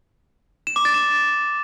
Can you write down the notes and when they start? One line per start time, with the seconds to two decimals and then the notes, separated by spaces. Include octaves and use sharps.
0.67 E7
0.76 D6
0.85 A6
0.94 E7